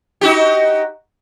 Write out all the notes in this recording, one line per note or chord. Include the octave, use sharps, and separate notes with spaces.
D#4 F#4 G4